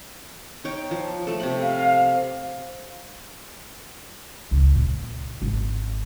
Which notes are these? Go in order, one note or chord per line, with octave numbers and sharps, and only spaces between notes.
D#4 C#5 G5
F3
A3 A4
C3 G5 B5
F5
C#2
A#2
G#1